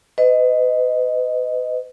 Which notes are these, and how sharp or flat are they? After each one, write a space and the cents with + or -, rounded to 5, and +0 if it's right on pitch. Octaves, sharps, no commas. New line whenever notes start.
B4 +40 D#5 +0